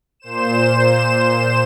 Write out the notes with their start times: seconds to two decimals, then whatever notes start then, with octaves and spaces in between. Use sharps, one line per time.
0.20 A#2 C5 E7